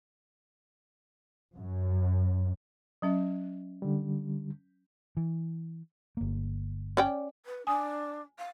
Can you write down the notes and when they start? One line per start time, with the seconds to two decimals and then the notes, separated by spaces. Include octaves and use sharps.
1.55 F#2
3.02 F#3 C#4 E5
3.82 D3 G3
5.17 E3
6.17 G1 A#3
6.97 C#4 D5 G5
7.46 B4
7.67 D4 G#5 D#6
8.39 F5